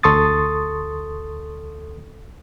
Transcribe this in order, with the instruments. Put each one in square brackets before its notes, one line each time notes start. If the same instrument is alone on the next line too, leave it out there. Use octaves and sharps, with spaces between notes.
[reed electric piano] D2 A4 C6 C#6 D#6 A6